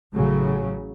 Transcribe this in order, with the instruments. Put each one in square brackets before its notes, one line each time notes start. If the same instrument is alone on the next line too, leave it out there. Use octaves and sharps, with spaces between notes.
[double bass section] A1 A2 C#3 F#3